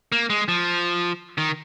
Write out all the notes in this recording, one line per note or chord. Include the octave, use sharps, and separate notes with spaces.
A#3
G#3
F3
D#3